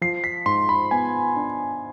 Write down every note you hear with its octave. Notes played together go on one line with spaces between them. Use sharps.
F3 C7
B6
G#2 C6
B5
B3 G#5
D4